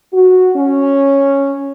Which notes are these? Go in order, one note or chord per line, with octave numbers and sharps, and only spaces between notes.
F#4
C#4